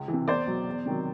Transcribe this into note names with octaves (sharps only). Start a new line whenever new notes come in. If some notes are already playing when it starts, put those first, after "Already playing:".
Already playing: C#2
E3
C3
E2 C5 D5
B2 F#3
E2
C3 D#3 F#3